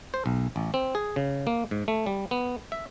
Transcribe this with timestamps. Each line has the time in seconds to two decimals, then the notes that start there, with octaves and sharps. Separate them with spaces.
0.14 C5
0.26 B1
0.56 A1
0.74 C4
0.95 G#4
1.16 C#3
1.47 A#3
1.71 G#2
1.88 A3
2.06 G3
2.31 B3
2.72 E5